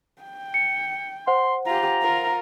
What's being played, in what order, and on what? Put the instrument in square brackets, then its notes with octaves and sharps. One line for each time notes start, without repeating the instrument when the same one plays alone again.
[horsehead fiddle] G5
[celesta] C#7
[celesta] C5 F#5 [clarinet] C6
[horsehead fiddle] F4 G4 [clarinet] A#5
[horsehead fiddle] F4 A#4